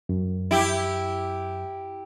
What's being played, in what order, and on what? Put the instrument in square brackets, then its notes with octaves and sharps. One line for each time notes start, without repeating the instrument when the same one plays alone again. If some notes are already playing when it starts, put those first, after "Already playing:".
[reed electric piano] F#2
[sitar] E4 G4